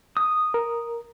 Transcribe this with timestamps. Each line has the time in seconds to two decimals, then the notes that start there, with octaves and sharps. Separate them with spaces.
0.17 D#6
0.54 A#4